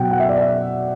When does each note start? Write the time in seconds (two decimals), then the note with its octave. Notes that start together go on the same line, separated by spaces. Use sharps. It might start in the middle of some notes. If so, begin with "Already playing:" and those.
Already playing: B2 F#3 F#5 G5
0.11 F#5
0.20 E5
0.29 D5
0.37 E5